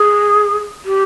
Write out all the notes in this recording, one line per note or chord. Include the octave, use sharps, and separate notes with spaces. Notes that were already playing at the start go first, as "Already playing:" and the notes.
Already playing: G#4
G4